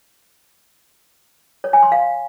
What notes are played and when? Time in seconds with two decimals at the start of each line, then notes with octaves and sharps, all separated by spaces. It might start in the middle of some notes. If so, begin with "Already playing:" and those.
1.64 C#5
1.73 G#5
1.83 C6
1.92 F5